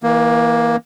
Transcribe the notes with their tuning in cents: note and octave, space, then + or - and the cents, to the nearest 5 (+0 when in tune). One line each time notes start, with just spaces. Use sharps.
E3 -20 A#3 +15